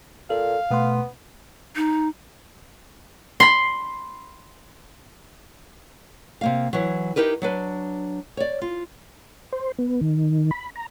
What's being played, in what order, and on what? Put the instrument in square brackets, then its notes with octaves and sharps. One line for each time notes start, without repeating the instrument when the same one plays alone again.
[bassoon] A#2 [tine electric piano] A4 [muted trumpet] F5
[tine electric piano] B2 A3 C6 [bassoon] B3
[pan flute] D#4
[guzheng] B5 C6
[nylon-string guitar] C3 A#3 F5
E3 F#3
D#4 E4 G4 A#4 B4
F#3 D4 B4
C#5 D5
F4
[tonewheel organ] C5
B3
D#3
B5
A#5